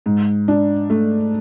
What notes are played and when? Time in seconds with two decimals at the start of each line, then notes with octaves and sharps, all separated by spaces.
0.06 G#2
0.48 D4
0.90 A3